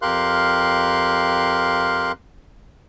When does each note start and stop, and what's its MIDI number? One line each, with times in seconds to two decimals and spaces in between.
0.02 2.12 41
0.02 2.12 67
0.02 2.12 70
0.02 2.12 77
0.02 2.12 84
0.02 2.12 90